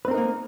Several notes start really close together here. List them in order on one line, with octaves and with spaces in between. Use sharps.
B4 C4 A#4 D#4 A#3